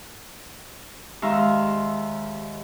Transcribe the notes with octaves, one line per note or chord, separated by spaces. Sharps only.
D#2 G#3 E5 F5 A#5 C6